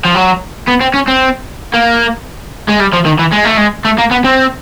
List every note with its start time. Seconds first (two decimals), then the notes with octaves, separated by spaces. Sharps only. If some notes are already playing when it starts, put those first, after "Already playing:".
0.05 F3
0.15 F#3
0.68 B3
0.81 C4
0.94 C#4
1.08 C4
1.74 A#3
2.68 G#3
2.79 G3
2.93 F3
3.05 D#3
3.19 E3
3.32 G#3
3.44 A3
3.57 G#3
3.85 A3
3.98 A#3
4.11 B3
4.25 C4